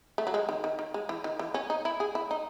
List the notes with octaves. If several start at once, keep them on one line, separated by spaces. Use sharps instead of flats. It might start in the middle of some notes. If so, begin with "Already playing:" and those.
A3
F#3
G#3
D#3
D#3
D#3
G#3
E3
D#3
E3
C#4
D#4
E4
G#4
E4
D#4